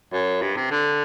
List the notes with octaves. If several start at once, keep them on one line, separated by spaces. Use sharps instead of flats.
F#2
G2
C3
D3